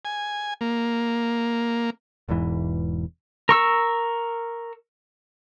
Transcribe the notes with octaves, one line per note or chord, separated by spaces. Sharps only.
G#5
A#3
E1 E2 G#2 E3
A#4 C#6 E6